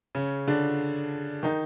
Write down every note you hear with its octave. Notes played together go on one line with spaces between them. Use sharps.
C#3 C#4
D3 D4
D#3 D#4